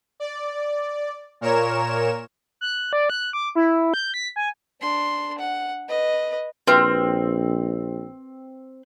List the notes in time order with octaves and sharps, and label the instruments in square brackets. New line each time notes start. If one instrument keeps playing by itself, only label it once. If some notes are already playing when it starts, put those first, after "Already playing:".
[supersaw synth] D5
A#2 A#4 C#5 E7
[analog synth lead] F#6
D5
F#6
D6
E4
G6
B6
G#5
[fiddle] D4 C6
F#5
B4 D#5
[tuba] A#1 [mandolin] C4 [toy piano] F#4 B4